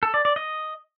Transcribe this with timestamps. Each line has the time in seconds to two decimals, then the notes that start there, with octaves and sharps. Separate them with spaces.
0.03 A4
0.14 D5
0.25 D5
0.36 D#5